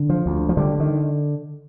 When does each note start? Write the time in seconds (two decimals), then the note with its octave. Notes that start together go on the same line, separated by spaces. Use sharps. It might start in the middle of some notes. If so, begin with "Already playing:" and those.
Already playing: D3
0.09 F3
0.26 D2
0.49 F3
0.57 D3 G3
0.80 D#3